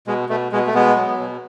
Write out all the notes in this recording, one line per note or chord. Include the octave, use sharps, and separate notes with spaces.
B2 G#3
B2 A3
B2 G#3
A3
B2 G#3 B3
F#3
B2